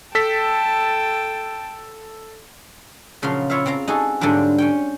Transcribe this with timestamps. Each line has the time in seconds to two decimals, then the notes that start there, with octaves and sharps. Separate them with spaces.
0.15 A4 G5 A5 B6
3.22 A#2 C#3 F3 F#3 F5 C6
3.50 E4 F4 C#5 E5 F5
3.66 C4 F4 F5 A#5
3.88 D#4 F#4 G#4 A4
4.21 G#2 D3 F#3 G3 D4 F4
4.58 C#4 C#5 G5